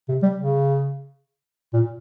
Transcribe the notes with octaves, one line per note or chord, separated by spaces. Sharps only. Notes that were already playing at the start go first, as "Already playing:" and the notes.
C3
G3
C#3
A#2